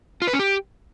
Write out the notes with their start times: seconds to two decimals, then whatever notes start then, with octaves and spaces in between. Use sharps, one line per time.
0.22 F4
0.28 B4
0.33 C#4
0.39 G4